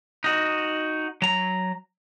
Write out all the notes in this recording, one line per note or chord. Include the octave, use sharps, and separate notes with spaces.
D#4 F#4
F#3 A#5